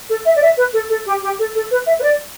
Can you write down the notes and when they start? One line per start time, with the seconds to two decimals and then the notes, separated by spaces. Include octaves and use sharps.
0.10 A4
0.25 E5
0.36 D5
0.42 E5
0.57 B4
0.73 A4
0.90 A4
1.06 G4
1.23 G4
1.39 A4
1.55 A4
1.71 B4
1.86 E5
1.99 B4
2.03 D5